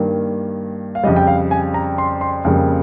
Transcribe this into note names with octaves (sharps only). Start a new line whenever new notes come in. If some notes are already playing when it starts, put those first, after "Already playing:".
Already playing: G2 D#3 A#3
F5
F2 C#3 G3 D#5
G5
F5
G#5
A#5
C6
C6
F2 C#3 G3 A#3